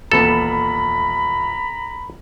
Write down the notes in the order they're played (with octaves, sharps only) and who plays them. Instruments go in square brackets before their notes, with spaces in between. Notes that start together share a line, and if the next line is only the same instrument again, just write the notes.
[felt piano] D#1 E3 B3 [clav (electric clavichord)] A4 [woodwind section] A#5 B5